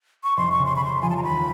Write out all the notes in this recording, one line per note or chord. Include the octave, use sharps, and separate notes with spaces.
C#6
F1 C6
C#6
C#3
C6
B5
C#3 C6
F3 G#5
A5
A#5
D#2 B5